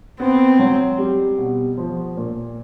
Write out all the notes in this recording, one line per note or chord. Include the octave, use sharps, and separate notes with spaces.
B3 C4
F#3
G3
B2
F3
A#2